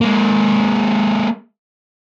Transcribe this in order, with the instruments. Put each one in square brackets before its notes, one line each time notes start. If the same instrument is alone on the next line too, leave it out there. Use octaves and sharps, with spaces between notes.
[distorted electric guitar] G#3 A#3